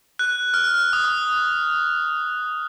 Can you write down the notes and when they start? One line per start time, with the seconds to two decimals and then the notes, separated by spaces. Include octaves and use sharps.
0.19 F#6
0.54 F6
0.93 D#6